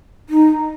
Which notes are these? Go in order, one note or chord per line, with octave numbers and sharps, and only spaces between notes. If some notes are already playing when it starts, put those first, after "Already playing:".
D#4